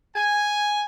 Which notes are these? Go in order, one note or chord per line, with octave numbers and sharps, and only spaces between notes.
G#5